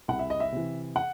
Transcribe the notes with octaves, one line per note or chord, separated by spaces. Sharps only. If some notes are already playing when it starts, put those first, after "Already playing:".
C2 F#5
E5
D#5
E5
C3 E3
F#5